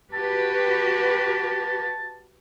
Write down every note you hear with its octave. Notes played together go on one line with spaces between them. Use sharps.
F#4 G4 B4 A5